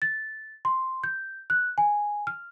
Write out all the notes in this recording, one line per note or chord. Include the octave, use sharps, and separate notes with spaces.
A6
C6
G6
F#6
G#5
F6